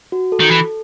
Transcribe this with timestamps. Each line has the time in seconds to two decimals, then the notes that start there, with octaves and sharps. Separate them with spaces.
0.12 F#4
0.32 A4
0.40 D#3
0.51 E3